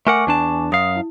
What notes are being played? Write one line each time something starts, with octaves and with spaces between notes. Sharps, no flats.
A3 A#4 F#5 G#5 C#6 D6
E2 D4 A5
F#2 F5 D#6
E4